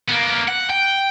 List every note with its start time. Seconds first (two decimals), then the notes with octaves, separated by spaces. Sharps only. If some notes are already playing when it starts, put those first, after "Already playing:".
0.08 A#3 B3
0.48 F#5
0.70 G5